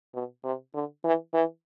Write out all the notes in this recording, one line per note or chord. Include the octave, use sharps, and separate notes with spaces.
B2
C3
D3
E3
E3